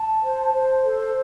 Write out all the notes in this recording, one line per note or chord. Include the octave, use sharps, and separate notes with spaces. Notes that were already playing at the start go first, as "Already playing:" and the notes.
Already playing: A5
C5
C5
A4